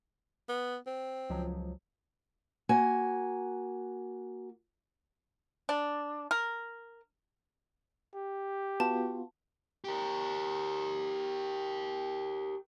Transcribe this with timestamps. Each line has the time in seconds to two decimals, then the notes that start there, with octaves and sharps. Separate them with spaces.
0.49 B3
0.87 C4
1.30 C#2 F3 F#3
2.69 A#3 F#4 G#5
5.69 D4
6.31 A#4
8.15 G4
8.80 B3 F4 F#4 A5
9.84 G4 A#4